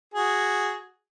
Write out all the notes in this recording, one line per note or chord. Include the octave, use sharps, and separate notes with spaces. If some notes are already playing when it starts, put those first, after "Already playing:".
F#4 G#4